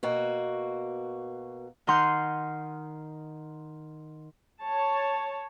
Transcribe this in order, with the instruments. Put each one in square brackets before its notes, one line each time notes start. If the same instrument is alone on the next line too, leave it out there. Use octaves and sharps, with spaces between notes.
[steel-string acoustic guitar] B2 A#3 F#4
[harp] D#3 D#4 F#5 C6 F6 G6
[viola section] C#5 A5